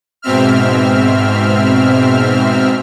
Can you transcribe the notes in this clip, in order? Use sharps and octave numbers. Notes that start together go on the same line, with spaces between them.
G#2 B2 C4 E5 F6